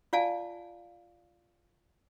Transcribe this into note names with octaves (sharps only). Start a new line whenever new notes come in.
F4 D5 F5 G#5 A5